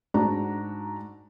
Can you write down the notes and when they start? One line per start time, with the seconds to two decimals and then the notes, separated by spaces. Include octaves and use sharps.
0.14 G#2 D4 F#4 A#5